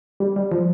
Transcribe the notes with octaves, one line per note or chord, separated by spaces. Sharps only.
G3
G3
F3